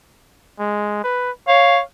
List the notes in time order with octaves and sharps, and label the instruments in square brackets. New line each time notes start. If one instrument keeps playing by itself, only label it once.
[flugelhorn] G#3
B4
[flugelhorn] C#5 [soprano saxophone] F5